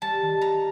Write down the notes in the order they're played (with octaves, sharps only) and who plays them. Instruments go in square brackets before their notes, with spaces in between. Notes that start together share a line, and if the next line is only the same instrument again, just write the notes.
[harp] G3 [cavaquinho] A5
[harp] D#3
[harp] A#3 [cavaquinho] A#5